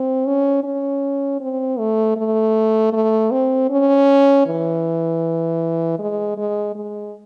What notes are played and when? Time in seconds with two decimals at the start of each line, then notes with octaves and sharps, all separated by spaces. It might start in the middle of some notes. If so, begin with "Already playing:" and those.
Already playing: C4
0.26 C#4
0.64 C#4
1.40 C4
1.79 A3
2.17 A3
2.93 A3
3.31 C4
3.70 C#4
4.46 E3
5.99 G#3
6.38 G#3
6.75 G#3